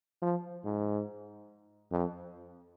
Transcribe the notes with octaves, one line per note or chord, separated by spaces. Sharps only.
F3
G#2
F2